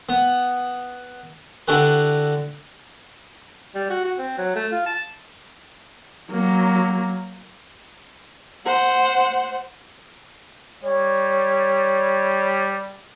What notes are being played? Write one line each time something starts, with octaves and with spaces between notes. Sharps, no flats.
B3
D3 E4 F#4 G4 B4
G3
F#4
F#4
C4
F#3
A3
F4
A5
F#3 A#3
C5 F#5
G3 C#5